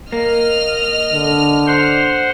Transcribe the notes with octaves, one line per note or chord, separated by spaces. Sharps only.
A#3 D#5 F6
D3
C5 F#5 C6